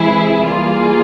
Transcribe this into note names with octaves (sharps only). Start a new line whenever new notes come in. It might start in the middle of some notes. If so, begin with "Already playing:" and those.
Already playing: C3 E3 G#3 E4 G#4
E3 G3 A#3 F4 G#4